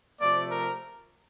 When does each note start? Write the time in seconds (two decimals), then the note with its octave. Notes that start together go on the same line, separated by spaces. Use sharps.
0.21 C3 F3 A3 D5
0.51 A#4